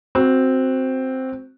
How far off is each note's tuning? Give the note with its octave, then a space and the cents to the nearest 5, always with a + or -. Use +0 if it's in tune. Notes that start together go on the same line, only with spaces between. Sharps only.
C4 +0 F#4 +0